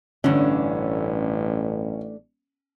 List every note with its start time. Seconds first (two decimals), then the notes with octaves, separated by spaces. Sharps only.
0.24 A1 G2 D3 A3 C#4 D4